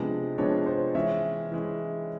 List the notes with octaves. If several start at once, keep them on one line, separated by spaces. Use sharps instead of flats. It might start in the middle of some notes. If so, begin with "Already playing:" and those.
Already playing: C3 F3 G#3 B3 D4
C3 F3 G#3 B3 D4 C#5
C5
E3 G#3 C#4 E5
E3 G#3 C#4